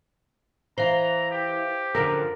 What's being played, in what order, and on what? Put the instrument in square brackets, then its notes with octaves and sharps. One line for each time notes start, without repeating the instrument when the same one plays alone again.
[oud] E3 [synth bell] C5 F5 [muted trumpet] A#5
[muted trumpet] G4
[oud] F#2 D3 F3 [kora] A#4